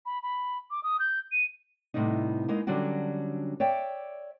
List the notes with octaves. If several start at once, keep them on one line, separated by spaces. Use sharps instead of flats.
B5
B5
D6
D#6
G6
D#7
A2 C3 G3 B3 D#4
G#3 A#3 B3 D#4
D3 F#3 G3 C#4 D4 F#4
C#5 D5 E5 G5